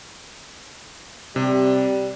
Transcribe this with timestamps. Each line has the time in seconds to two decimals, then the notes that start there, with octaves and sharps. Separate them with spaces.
1.36 C3 G3